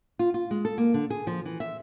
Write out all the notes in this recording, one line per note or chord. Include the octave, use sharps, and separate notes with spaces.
F4
F4
G#3
A4
A#3
D3
G#4
F3
E3
E5